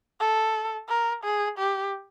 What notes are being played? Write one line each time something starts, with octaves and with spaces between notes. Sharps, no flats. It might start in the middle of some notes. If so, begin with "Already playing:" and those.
A4
A#4
G#4
G4